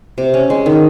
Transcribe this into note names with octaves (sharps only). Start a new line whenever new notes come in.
C3
C#4
G#3
D#3